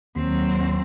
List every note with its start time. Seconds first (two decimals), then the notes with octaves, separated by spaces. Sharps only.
0.16 D#2 F#3 C4